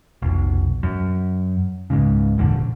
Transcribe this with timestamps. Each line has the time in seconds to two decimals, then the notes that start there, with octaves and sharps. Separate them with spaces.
0.22 F1 B1
0.83 F#2
1.90 C#2 G#2 C#3
2.38 E1 A#1 D3